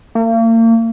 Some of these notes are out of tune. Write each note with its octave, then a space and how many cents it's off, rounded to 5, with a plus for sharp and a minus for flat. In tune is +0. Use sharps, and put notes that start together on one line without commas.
A#3 -40